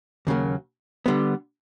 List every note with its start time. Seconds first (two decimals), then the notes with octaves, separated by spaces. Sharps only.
0.27 D#2 C#3 F#3 A#3
1.06 D3 G3 B3